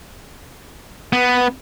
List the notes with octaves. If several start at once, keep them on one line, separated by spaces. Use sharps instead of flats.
B3